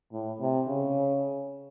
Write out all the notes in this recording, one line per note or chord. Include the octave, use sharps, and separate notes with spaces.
A2
C3
C#3